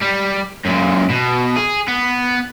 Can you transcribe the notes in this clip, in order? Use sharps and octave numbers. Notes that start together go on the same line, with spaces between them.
G3
F#2 A#2
B2
G#4
B3